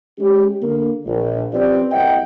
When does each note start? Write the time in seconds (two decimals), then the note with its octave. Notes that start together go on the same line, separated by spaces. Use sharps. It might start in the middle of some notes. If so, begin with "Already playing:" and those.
0.19 G#3 C#4 G4
0.62 D3 A#3
1.06 A#1
1.53 F3 C4 C#4 G4 B4 D5
1.92 F#1 C2 D#5 E5 F#5 G5